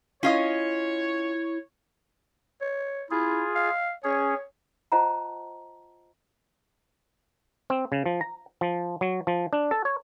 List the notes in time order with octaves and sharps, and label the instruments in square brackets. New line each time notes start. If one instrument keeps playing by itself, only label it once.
[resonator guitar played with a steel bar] C#4 F4 D#5 [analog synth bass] E4 [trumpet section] C#5
[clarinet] C#5
[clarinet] E4 [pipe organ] F4 G#4
[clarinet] F5
[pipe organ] C#4 G#4 [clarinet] C#5
[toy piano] F4 C5 D#5 F#5 A5 A#5
[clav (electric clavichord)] C4
C#3
F3
A#5
F3
F#3
F3
D4
A4
C#5